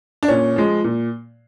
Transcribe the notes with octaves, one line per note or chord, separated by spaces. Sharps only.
D4
A#2 C#4
F3 G#3
A#2